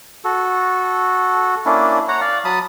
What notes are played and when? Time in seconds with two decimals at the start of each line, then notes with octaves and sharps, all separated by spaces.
0.24 F#4 A4
1.66 A#3 C#4 D4 E4
2.08 C#5 F#5 A#5
2.21 D5 F5
2.45 F#3 A5 B5 D#6